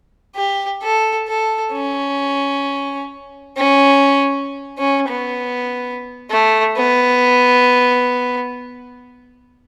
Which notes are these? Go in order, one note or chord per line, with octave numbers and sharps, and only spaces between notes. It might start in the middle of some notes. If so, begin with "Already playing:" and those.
G4
A4
A4
C#4
C#4
C#4
B3
A3
B3